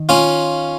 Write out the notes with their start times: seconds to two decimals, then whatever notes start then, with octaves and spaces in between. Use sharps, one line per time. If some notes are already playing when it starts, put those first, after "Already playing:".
Already playing: D#3
0.09 C#4 F4